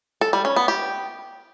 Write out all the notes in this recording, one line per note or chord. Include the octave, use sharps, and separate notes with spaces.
A4
G3
C#4
B3
G4